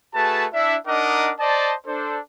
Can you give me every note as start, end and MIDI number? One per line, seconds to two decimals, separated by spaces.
0.15 0.46 57
0.15 0.46 66
0.15 0.46 68
0.15 0.46 71
0.15 0.46 81
0.53 0.77 62
0.53 0.77 64
0.53 0.77 76
0.87 1.32 62
0.87 1.32 63
0.87 1.32 70
0.87 1.32 75
0.87 1.32 78
0.87 1.32 86
1.40 1.75 72
1.40 1.75 74
1.40 1.75 75
1.40 1.75 81
1.86 2.19 62
1.86 2.19 69
1.86 2.19 72